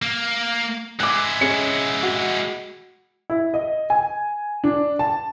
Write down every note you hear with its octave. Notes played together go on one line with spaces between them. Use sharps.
A#3
G#3 E4 D6 F#6
C#4 G#4 C#7
F#4
E4
D#5
G#5
D4
A5